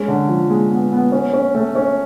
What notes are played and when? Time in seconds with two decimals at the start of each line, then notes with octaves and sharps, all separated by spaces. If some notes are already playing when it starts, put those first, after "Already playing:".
Already playing: G#3 C#4
0.08 D3
0.29 F3
0.50 G#3
0.70 B3
0.92 B3
1.12 C#4
1.33 C#4
1.54 A3
1.75 C#4